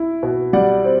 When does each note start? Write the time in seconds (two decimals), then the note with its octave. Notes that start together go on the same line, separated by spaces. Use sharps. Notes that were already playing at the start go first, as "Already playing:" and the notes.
Already playing: E4
0.23 B2
0.53 G3 D5 F#5
0.84 C4